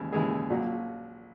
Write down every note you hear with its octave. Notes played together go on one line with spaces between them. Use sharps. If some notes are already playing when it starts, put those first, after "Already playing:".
Already playing: D#2 C#3 E3 G#3
D#2 C#3 E3 G#3 G#4
A#1 A#2 F#3